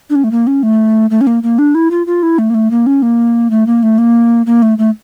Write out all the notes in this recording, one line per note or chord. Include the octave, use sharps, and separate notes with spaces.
D4
C#4
A3
A#3
C#4
A3
A3
C#4
A#3
A#3
D4
E4
F4
F4
E4
A3
A#3
A3
A#3
C#4
A#3
A3
A#3
A3
A#3
A#3
A3
A3